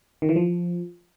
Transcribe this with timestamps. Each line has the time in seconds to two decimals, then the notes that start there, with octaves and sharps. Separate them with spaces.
0.22 D#3
0.29 E3
0.36 F3